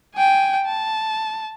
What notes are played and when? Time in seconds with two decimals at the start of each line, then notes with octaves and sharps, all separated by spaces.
0.16 G5 G#5
0.65 A5